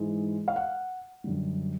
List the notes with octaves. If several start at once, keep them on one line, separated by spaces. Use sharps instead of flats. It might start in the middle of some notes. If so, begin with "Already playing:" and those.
Already playing: G#2 E3 G#3
F5
F#5
F#2 D3 G3